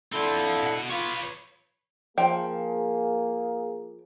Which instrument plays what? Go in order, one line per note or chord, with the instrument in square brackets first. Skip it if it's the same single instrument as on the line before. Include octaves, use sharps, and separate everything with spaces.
[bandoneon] D3 E4 A4 [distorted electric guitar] C4 F4
[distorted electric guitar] B2 F#5
[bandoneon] F4 D6 [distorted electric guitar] B4 C#5
[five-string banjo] F3 G5 [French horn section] A#3 G#4